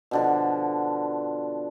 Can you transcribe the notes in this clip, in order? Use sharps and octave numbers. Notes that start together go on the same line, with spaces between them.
B2 D3 F3